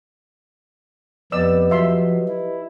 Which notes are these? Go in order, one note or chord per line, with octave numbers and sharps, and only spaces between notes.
F2 B3 G4 B4 D5 D#5 E6
F3 F#3 E5 C6
E4